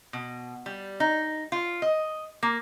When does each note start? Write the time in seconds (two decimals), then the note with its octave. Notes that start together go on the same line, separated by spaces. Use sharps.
0.13 B2
0.66 G3
1.00 D#4
1.52 F4
1.82 D#5
2.43 A#3